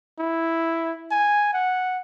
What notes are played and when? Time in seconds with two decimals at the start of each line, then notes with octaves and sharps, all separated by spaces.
0.19 E4
1.11 G#5
1.53 F#5